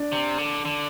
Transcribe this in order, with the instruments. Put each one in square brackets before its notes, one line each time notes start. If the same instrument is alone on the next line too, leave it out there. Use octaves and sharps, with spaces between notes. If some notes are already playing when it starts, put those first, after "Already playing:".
Already playing: [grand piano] D4
[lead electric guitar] C3
D3
D3